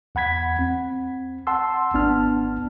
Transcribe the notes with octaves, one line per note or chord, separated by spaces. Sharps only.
E2 F#5 B5 G#6 B6
C4
F#5 A5 C6 E6
G#1 B3 D4 A5 F6